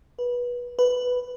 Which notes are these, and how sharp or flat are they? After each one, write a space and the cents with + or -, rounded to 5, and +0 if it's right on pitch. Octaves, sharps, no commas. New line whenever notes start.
B4 -20
B4 +5